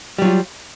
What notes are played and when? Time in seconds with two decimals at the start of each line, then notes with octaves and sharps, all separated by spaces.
0.18 G3
0.22 F#3
0.25 F4